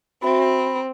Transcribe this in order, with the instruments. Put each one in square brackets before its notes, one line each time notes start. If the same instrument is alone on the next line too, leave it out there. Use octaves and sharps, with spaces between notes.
[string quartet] C4 [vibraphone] F#4 E5 [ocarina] B5